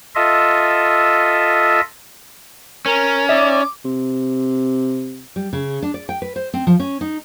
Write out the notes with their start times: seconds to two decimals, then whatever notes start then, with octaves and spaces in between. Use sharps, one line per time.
0.15 F4 A4 D#5 E5
2.86 C#4 A#4
3.29 D#4 D5 E5 D6
3.85 C3
5.36 G3
5.53 C#3
5.82 D4
5.94 D5
6.09 G5
6.22 B4
6.36 C5
6.54 C4
6.67 F3
6.80 C#4
7.01 D#4